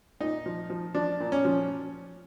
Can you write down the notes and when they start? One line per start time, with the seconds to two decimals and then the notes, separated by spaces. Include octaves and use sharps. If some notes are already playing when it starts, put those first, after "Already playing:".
0.21 A#2 D#4
0.46 F3
0.70 F3
0.94 F3 D4
1.20 A#2
1.32 C#4
1.45 F3